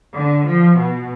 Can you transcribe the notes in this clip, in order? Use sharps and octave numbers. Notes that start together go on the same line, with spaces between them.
D3
F3
B2